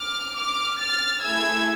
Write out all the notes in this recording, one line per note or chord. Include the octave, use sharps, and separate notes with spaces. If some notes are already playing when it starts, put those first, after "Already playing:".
Already playing: D6 F6
D6 F6
F6 A6
A3 E4 G#4 E6 G#6